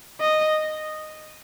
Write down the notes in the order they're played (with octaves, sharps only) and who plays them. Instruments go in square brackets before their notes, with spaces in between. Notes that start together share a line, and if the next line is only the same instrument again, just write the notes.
[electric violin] D#5